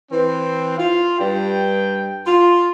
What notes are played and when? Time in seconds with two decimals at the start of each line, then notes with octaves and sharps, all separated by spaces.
0.11 E3 C4
0.77 F4 F5
1.18 G2 G5
2.25 F4